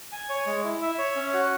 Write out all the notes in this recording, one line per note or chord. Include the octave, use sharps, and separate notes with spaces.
G#5
C#5
G#3
E4
E5
C#5
C#4
F#4